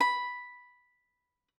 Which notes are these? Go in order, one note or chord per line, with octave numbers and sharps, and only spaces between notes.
B5